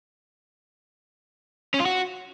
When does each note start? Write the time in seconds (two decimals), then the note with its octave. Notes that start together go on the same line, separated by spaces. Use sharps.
1.74 C#4
1.80 F4
1.86 F#4